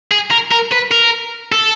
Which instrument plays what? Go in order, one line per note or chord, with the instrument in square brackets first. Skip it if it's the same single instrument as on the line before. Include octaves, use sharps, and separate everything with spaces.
[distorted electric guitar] G#4
A#4
A#4
B4
A#4
A4